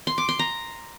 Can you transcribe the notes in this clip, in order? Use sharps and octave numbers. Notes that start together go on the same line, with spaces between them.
C6
D6
C6
A#5